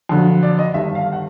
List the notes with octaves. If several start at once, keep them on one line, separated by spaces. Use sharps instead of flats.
F2 D3 F#3
D5
D#5
G1 G2 D#3 E5
F5
F#5